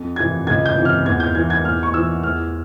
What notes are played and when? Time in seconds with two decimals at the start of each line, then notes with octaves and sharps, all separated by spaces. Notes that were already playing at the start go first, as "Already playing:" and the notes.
Already playing: F2
0.16 C3 E3 G#6
0.47 C#2 G#6
0.66 G6
0.76 C3 E3
0.85 F6
1.05 E2 G#6
1.20 G6
1.35 E3 G#6
1.50 G#6
1.64 E2 F6
1.83 C#6
1.94 E3 E6
2.23 E2 F6